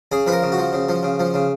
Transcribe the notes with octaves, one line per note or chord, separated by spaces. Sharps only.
C#3 G#4
F3 B4
A#4
C#3
F#4
F3
C#3
F3
C#3
F3
C#3